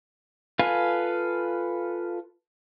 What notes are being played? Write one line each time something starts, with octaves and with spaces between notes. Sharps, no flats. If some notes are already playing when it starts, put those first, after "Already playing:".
F4 A4 B4 F5 G#5